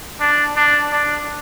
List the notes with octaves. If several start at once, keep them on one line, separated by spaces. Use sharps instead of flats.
D4
D4
D4